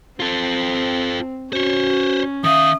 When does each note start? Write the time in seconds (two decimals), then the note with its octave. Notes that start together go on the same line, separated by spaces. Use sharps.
0.20 C4 F4 A4
1.53 C#4 F#4 C5 C#5
2.44 D#3 E5 F5 D#6